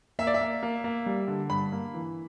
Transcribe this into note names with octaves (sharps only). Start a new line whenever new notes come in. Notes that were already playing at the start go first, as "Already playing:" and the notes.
A#3 E5
D5
E5
A#3
A#3
A#3
G3
D3
G2 B5
A#3
E3